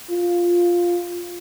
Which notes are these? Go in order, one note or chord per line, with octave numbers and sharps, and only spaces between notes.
F4